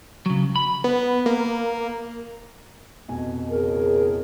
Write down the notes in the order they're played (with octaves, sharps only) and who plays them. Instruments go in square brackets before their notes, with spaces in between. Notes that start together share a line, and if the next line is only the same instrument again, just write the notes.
[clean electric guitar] C#3 F#3
B5
[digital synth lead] B3
A#3
[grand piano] F1 B2 G#5
[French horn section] A2 C#3 G#4 [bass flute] A#4